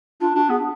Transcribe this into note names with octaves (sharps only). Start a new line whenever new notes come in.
D4 F4
D4 F#4
B3 G#4